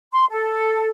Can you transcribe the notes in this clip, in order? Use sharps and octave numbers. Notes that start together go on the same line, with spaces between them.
C6
A4